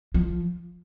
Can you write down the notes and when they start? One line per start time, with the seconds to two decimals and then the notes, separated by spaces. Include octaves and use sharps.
0.14 F3